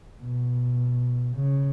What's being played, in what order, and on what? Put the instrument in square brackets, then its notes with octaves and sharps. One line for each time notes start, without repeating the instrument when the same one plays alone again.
[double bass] B2
C#3